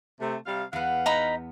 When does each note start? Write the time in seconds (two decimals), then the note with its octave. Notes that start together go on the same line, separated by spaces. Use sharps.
0.21 C3 A3
0.46 C3 G3 F5
0.73 E2 B3 F5 F#5
1.06 D#4 A#5 B5